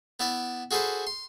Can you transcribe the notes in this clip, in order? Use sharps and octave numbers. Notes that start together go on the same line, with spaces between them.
B3 E4 D5
F#4 G#4 A4 B4 C5
C6